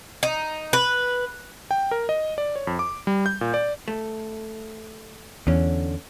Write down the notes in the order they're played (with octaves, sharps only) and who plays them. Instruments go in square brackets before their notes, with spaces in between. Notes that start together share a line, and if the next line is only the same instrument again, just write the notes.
[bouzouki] D#4
B4
[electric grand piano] G5
A#4
D#5
D5
C#5
F2
D6
G3
G6
A#2
D5
[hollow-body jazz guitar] A3
[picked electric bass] E2 [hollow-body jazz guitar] D3 C#4